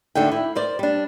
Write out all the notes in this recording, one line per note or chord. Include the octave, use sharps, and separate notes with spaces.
D2 D3 D#3 G5
E4
A#4 C5 D5
G3 D4